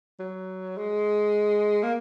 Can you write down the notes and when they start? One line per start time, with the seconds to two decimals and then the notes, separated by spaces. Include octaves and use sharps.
0.19 F#3
0.78 G#3
1.83 A#3